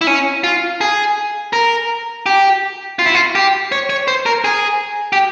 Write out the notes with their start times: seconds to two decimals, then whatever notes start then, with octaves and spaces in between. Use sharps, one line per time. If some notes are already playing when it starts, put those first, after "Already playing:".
0.01 E4
0.07 C#4
0.44 F4
0.81 G#4
1.53 A#4
2.26 G4
2.99 F4
3.06 E4
3.14 F4
3.35 G4
3.72 C#5
3.90 C#5
4.08 C5
4.26 A#4
4.44 G#4
5.13 G4